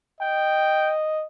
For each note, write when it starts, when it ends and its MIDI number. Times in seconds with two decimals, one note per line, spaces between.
0.21 1.25 75
0.21 0.95 79